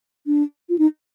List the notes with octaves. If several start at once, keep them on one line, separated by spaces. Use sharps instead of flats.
D4
F4
D#4